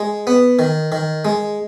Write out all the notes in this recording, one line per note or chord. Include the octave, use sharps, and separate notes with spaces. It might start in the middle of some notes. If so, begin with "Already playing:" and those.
Already playing: G#3
B3
D#3
D#3
G#3